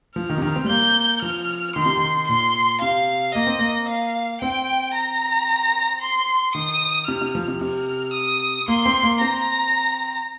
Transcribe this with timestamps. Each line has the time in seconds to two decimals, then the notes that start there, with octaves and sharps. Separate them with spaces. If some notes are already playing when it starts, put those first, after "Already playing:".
0.16 F3 F6
0.30 D#3
0.38 C3
0.42 D#3
0.56 C4
0.64 G3
0.69 A#3 G6
1.22 F3 F6
1.76 D#3 C6
1.86 C3
1.97 D#3
2.28 A#2 C6
2.82 C3 F5
3.35 A#3 D#5
3.47 C4
3.59 A#3
3.89 F5
4.42 C4 G5
4.95 A#5
6.02 C6
6.55 D#3 D#6
7.08 C3 F6
7.21 C3
7.35 F3
7.48 C3
7.61 C3 F6
8.14 D#6
8.68 A#3 C6
8.86 C4
9.03 A#3
9.21 C4 A#5